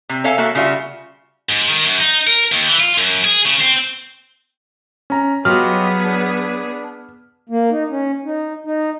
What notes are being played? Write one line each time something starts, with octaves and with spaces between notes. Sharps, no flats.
C3
A4 C#5 E5 F5 G#5
A#3 F#4 A4 E5
C#3 G3 F4 F#4 E5
G#2
D#3
F#2
D#4
A#4
D#2
E3
F4
F#2
G#4
C#3
C4
C#4 A#5
F#3 B3 F4 G4 G#4 D#5 F6
D4
A#3
D#4
C#4
D#4
D#4